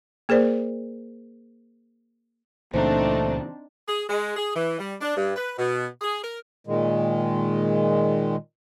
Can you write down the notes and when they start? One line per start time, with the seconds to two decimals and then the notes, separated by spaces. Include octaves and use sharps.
0.29 A#3 G#4 A#4 C5 D5
2.74 C#2 A#2 E3 A3 C4 D4 D#4 C5
3.87 G#4
4.08 G#3
4.36 G#4
4.55 E3
4.79 G3
5.01 D4
5.16 G2
5.35 B4
5.58 B2
6.01 G#4
6.22 A#4
6.67 A#2 D#3 G#3